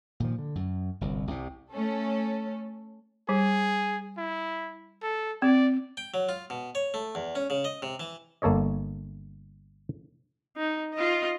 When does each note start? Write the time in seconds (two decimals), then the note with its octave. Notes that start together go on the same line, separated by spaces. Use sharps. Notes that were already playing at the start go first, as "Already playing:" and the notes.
0.20 A#2 D#3 F3
0.38 D3
0.55 F#2
1.01 G1 C2
1.27 C2 C3
1.72 A3 C#4 A4
3.29 G3 G#4
4.18 E4
5.03 A4
5.42 C4 D5
5.97 G5
6.14 F#3
6.29 F4
6.50 B2
6.75 C#5
6.94 A3
7.15 E2
7.35 C#4
7.50 C#3
7.65 D#5
7.82 C3
8.00 E3
8.42 G1 A#3 A4 C#5 D#5
10.57 D#4
10.94 F4 D#5